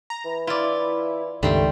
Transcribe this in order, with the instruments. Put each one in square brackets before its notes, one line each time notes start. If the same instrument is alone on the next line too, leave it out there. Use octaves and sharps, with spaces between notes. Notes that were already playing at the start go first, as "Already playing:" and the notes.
[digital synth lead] A#5
[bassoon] E3
[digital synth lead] E4 [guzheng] F4 D5
[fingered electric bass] C#2 D#3 [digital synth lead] G2 [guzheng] G3 C4 [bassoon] A3